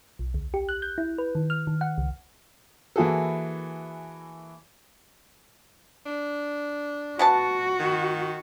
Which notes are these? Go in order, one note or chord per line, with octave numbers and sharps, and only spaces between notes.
B1
D2
G4
F#6
G6
E4
B4
D#3
F6
D#3
F#5
C#2
E3 A#3 E4 F#4 G#4 A4
D4
B2 F#4 F#5 A5
D#3